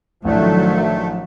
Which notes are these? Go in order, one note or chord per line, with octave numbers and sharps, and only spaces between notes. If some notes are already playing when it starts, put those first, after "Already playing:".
A1 A2 D#3 F3 F#3 A3 D4